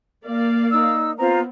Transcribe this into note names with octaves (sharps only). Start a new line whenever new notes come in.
A#3 D5 F5
D#4 E6
B3 C4 F4 C5 A#5